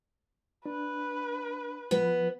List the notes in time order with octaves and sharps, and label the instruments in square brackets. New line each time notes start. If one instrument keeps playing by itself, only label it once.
[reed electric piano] D4 [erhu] B4
[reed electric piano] F3 [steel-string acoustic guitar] B3